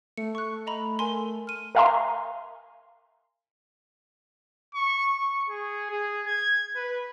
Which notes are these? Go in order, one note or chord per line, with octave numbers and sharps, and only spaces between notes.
A3 C#7
C#6 F#6
D#5 A#5 B5
A#4 G#5 C6
F6 D#7
A#4 E5 F5 G#5 A#5 C6
C#6
C#6
G#4
G#4
G#6
B4